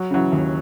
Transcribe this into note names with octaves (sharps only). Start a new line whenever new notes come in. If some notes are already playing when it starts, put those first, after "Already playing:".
Already playing: F#3
C#3 E3 F#3
D#2